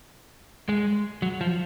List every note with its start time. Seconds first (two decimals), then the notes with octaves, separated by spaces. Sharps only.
0.69 G#3
1.22 F#3
1.41 F3